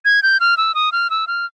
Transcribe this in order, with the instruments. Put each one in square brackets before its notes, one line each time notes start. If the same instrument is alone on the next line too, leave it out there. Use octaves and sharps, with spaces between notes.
[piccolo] G#6
G6
F6
E6
D#6
F6
E6
F6